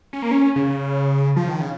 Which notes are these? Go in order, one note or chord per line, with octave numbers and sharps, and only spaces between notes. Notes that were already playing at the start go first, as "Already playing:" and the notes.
C#4
A#3
C#4
C#3
F3
D#3
C#3